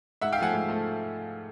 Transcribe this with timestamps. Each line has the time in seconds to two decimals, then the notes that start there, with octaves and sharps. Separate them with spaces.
0.21 G#2 E5 F#5
0.32 F5 G5
0.38 F3 A3 F#5 G#5
0.53 G#2
0.68 F3 A3